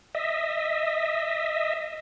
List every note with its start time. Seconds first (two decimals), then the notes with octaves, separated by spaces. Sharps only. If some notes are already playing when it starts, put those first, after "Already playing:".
0.15 D#5 E5